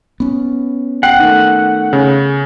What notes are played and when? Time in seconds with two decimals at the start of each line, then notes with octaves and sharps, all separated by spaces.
0.20 B3 C#4
1.03 F#5 G5 F#6 C7
1.19 D#3 A3
1.93 C#3